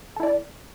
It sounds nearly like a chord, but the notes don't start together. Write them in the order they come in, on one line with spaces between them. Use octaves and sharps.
A4 E4 D5